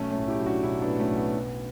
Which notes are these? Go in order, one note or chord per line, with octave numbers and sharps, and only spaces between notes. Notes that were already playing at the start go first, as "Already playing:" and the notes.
Already playing: B1 A3 C#4
A3 C#4
A2
E4 G4
F#3
D4 F#4
B1 C#4 E4
B3 D4
A2
A3 C#4
B1
B3
F#3